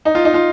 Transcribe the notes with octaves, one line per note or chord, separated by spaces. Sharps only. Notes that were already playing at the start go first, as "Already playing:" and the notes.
D#4
F4
D#4
F4